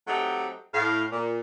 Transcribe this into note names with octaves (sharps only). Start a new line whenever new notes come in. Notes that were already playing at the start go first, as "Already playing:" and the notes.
F#3 A3 C4 D#4 G4
A2 F5
A#2